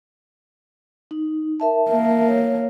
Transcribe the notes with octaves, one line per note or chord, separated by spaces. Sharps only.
D#4
A#4 E5 A5
A#3
C#5